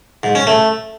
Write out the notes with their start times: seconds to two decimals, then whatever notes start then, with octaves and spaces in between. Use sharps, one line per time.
0.23 G#2
0.35 C#4
0.47 A3